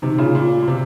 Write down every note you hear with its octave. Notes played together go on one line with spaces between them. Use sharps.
C3 D#3
A#2 C#3
A#2
A#2
C3